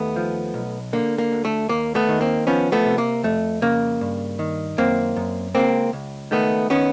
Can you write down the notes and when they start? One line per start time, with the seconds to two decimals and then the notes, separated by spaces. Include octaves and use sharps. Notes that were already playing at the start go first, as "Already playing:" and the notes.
Already playing: D#2 A3 B3
0.16 F3
0.54 B1
0.93 D3 A#3
1.18 A#3
1.32 D2
1.45 A3
1.69 D#2 A#3
1.95 A3 B3
2.09 D#3
2.21 A#3 C4
2.47 F3 B3 C#4
2.72 A3 B3
2.85 C3
2.98 A#3
3.23 F2 A3
3.62 C#3 A#3
4.01 G2
4.39 D#3
4.78 F#2 A#3 C4
5.16 F#2
5.55 C#2 A#3 C4
5.93 C#2
6.31 D#3 A3 B3
6.70 D#3 B3 C#4